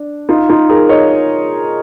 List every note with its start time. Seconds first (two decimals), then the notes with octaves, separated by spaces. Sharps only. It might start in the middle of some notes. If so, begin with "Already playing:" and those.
Already playing: D4
0.29 D#4 F4
0.49 D#4 F4
0.69 G#4 A#4
0.89 C#5 D#5